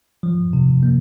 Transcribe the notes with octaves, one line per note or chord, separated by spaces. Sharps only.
F3
C3
A#3